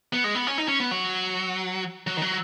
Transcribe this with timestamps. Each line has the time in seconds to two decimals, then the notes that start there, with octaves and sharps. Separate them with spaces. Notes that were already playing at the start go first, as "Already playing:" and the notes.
0.13 B3
0.24 G#3
0.35 B3
0.47 C#4
0.58 D#4
0.68 C#4
0.80 B3
0.91 F#3
2.07 F#3
2.17 D#3
2.22 F#3